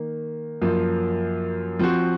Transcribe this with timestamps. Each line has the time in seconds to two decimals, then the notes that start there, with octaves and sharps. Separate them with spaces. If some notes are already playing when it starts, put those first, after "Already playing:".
Already playing: D#3 A#3
0.61 F#2 F3 A#3
1.79 F3 C4 F#4